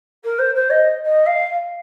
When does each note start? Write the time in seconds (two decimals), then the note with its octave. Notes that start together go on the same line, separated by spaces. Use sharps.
0.24 A#4
0.38 C5
0.55 C5
0.70 D#5
1.05 D#5
1.26 F5